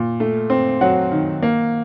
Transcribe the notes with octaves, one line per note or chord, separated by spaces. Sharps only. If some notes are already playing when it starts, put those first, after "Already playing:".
Already playing: A#2
A3
C4
F#3 F#5
D#3
A#3